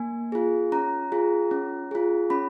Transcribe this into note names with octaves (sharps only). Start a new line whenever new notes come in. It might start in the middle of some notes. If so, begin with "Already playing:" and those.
Already playing: A#3 G#5
F4 G#4
C#4 A#5
F4 G#4
C#4
F4 G#4
C#4 B5